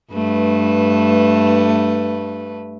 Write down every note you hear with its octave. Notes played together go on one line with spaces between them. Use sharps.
G2 A3 B4